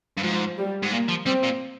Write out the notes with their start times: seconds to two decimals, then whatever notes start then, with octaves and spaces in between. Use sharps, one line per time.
0.18 G2
0.23 G#2 F3
0.58 G3
0.83 G#2
0.91 A#2 A#3
1.09 F3
1.26 G3 C4
1.43 A#2